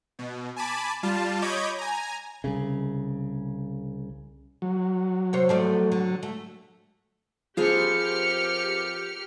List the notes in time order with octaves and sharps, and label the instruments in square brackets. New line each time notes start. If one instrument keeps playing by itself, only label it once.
[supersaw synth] B2
G#5 A5 B5 D6
G3 F4 A5
C#5 D#5 B5 D6 G6 G#6
G#5 A#5
[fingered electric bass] C2 C#3
[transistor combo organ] F#3
[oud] C3 C5 C#5
F3 A3 D5
D3
A3
[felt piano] F3 C4 [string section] G4 F6 C#7 [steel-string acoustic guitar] G#4 A#4 B4